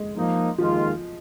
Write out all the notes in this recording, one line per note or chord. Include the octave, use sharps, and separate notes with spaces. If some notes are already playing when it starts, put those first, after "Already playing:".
Already playing: G#3
F3 A#3 D#4
D#2 D#3 F3 G#3 F4